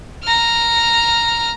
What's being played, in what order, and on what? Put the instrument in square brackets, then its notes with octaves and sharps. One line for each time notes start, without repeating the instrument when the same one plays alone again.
[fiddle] A#5 F6